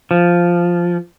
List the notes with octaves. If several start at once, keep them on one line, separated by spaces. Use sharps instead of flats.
F3